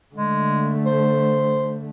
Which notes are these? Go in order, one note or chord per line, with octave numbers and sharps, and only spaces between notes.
D3 G#3 A3
C5